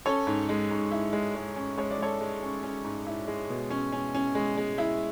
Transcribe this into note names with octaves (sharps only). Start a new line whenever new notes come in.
C#4 A4 C#5
G#2
G#3
G#2
E4
G#3
G#3
C#4
G#3 C#5
D5
G#3 A4 C#5
G#3
C#4
C#4
G#2
E4
G#3
B2
C#4
C#4
C#4
G#3
G#3
E4